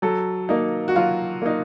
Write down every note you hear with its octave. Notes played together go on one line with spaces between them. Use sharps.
F#3 A4
A#3 D#4
F#4
F#3 F4
A#3 D#4